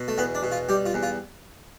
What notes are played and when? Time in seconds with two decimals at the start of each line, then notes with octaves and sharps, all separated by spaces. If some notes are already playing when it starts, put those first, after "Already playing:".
Already playing: B2
0.08 A3
0.18 E2 B3
0.35 D4
0.43 B2
0.52 F4
0.69 G3 G4
0.86 F4
0.94 E2
1.03 F4